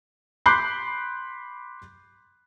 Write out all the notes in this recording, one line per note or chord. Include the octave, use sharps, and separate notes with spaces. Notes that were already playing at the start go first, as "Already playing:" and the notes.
B5 C6 D6 F#6 G6 C7